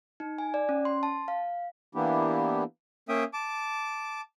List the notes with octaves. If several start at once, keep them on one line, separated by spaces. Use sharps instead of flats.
D#4
G#5
D5
C#4
C6
A5
F5
E3 A#3 B3 D4 E4 G4
A#3 C#4 E5 G5 D#6
A5 D6